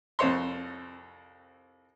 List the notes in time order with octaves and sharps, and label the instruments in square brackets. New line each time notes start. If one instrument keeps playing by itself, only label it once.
[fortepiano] C2 F2 C5 C#5 C6